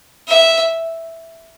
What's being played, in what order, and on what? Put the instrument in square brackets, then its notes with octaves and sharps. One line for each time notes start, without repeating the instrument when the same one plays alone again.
[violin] E5